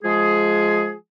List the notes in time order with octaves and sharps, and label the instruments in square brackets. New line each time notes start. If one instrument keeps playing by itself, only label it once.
[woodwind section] F3 G#3 G#4